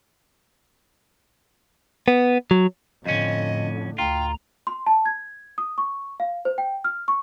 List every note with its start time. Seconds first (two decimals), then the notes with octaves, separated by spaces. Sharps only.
2.08 B3
2.51 F#3
3.06 F2 A2 D3 C#4 D#5
3.98 D2 F4 G5 A#5
4.67 C6
4.86 A5
5.06 G#6
5.58 D#6
5.78 C#6
6.20 F5
6.45 C5
6.58 G5
6.84 F6
7.08 C#6